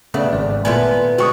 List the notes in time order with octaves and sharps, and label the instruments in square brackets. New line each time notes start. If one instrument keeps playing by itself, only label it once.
[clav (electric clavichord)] C#3 A3 B3 [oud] D4
[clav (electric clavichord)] G#1 [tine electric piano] D5
[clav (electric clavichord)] A#2 A3 G#5 [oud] B3 E4 F4
[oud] D3 G#3 C4 [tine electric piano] F#4 C#6 D#6